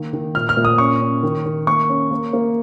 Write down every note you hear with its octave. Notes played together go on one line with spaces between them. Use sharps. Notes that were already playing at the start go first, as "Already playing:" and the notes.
Already playing: D#3 A#3
D#3
A#2 F6
F6
A#2
D#6
C#4 C#6
C#4
D#3
D#3
A#3 C#6
C#4
A#3
A#3